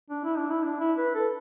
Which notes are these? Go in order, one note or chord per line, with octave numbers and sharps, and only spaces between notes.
D4
E4
D4
E4
D4
E4
B4
A4